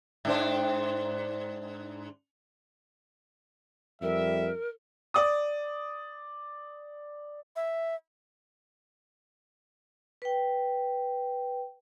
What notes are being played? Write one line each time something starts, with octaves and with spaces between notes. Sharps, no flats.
G#2 D4 C5
F2 G3 A#4 E5
D5 D#6
E5
B4 G5